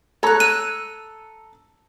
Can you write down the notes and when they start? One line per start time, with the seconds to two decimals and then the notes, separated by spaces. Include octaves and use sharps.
0.23 A4 C#5 A#5 F#6
0.40 E6 F#6 D#7